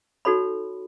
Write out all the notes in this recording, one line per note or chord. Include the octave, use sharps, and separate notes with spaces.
D#4 F#4 A4 C#5 B5